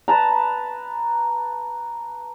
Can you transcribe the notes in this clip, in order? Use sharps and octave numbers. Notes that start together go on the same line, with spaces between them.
B4 A5 A#5